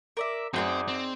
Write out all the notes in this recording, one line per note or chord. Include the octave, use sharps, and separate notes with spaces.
A#4 D5 E5
F#2 C4 D#4 G#4 C5 D5
C4